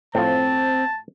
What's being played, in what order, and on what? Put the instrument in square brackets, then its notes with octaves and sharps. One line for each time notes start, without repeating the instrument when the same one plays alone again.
[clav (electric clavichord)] A2 F3 [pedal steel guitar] C4 [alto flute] C5 [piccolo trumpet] A5